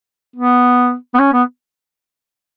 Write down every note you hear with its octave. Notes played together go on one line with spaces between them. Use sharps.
B3
B3
C#4
B3